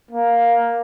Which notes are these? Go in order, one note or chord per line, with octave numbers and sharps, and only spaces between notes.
A#3